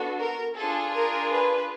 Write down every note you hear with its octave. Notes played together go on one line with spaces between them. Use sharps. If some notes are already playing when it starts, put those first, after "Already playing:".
Already playing: B3 D4 F#4 A4
A#4
D4 F4 G#4 A4
A#4
B4